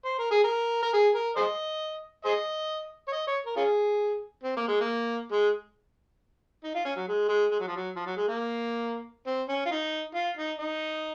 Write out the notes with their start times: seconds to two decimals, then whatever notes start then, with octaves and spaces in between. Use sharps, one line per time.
0.05 C5
0.19 A#4
0.31 G#4
0.44 A#4
0.83 A#4
0.93 G#4
1.15 A#4
1.36 G#4 C5 D#5
2.25 G#4 C5 D#5
3.08 C#5
3.12 D#5
3.27 C#5
3.46 A#4
3.56 C#4 F4 G#4
4.44 C4
4.57 A#3
4.68 G#3
4.81 A#3
5.32 G#3
6.64 D#4
6.75 F4
6.85 C#4
6.96 F#3
7.08 G#3
7.29 G#3
7.51 G#3
7.60 F#3
7.68 F3
7.76 F#3
7.96 F3
8.06 F#3
8.17 G#3
8.28 A#3
9.27 C4
9.49 C#4
9.66 F4
9.71 D#4
10.15 F4
10.37 D#4
10.58 D#4